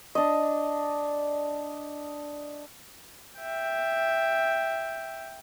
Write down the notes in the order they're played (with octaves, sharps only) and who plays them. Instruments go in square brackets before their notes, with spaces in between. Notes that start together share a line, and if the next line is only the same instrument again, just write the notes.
[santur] D4 D#5
[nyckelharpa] E5 G5